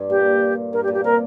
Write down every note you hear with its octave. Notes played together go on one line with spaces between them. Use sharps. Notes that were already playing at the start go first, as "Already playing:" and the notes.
Already playing: G2
A#2 G4
G2 A#4
G4
A#2
G4
C3 A#4